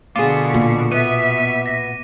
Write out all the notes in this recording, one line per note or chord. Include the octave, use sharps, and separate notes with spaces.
B2 D3 F4 G#4 D6
A#2
B2 B3 E5 D#7
A#6